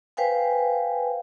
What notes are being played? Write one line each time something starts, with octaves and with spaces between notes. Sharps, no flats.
B4 C5 F5 G5 G#5